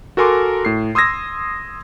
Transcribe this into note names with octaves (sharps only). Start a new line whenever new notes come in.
F#4 A4 A#4 G#5 C6 D6
A2 C7
C6 D#6 E6 G#6 A#6